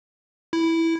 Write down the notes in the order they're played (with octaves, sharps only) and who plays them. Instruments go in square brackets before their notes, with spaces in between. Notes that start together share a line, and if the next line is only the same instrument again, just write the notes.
[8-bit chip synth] E4